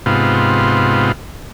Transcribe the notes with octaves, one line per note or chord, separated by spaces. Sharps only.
G#2 C3 B3 F4